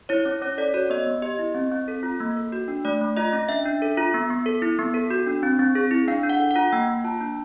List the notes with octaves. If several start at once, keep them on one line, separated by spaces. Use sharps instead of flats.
E4 C#5
C#4 C#5
C#4 C#5
A4 D5
F#4 C#5
B3 D#5
B3
G4 D#5
E4
C4
C4
A4
F4
A#3
A4
F#4
D4
A3 D5
A3
F4 D#5
C#4
D4 E5
D4
A4
F4
B3
B3
A4
E4
B3
A4
F#4
D4
C4
C4
G#4
E4
D4 F5
D4
F#5
A4
F#5
F4
A#3 G5
A#3
F4 A5
D4